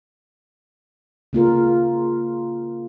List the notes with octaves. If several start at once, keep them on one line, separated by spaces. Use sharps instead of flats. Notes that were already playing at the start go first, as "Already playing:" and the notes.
C#3 A#3 F4 A#4